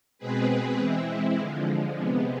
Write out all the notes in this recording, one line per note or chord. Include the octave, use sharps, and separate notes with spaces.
B2 G#3 C4 G#4 B4
E3 G#3 C4 E4
D3 F3 G#3
C3 G#3 B3